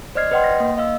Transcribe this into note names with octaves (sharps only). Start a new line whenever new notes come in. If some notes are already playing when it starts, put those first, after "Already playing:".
C5 D5 D#5 F6 G#6 C7
B4 C#5 D#5 F#5 G5 C6
A#6
A#3
D#5 F5 E6